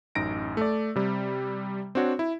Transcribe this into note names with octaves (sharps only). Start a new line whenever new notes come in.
A1 F#2 D#4 A#6 D7
A3 D5
C3 G3
C4 D4 F#4 C#5
E4